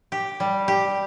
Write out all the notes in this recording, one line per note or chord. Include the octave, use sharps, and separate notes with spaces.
G4
G3
G4